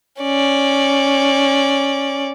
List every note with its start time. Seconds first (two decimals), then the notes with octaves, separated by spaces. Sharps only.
0.21 C#4 D5